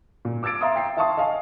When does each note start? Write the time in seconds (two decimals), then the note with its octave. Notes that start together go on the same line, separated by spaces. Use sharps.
0.25 A#2
0.43 D6 E6 G#6 A6 D7
0.61 E5 F5 A#5 C6 D#6
0.76 G5 C7
0.97 E5 F5 A5 C6 C#6 D#6
1.17 D#5 F5 G#5